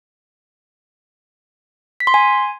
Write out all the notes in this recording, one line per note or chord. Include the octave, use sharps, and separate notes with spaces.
B6
C6
G#5